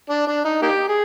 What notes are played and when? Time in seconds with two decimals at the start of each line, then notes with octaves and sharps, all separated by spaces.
0.09 D4
0.27 D4
0.44 D#4
0.62 A#3 D#4 G4
0.89 G#4